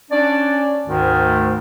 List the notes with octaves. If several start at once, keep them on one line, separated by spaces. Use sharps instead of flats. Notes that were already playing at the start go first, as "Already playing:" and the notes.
C#4 D4 D5
D2 G#2 D#3